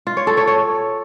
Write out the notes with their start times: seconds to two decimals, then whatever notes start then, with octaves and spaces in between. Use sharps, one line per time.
0.07 F4
0.17 C#5
0.27 A4
0.37 C#5
0.47 C#5